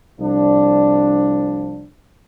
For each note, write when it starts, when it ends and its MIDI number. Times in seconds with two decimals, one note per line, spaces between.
0.20 1.86 36
0.20 1.86 53
0.20 1.86 62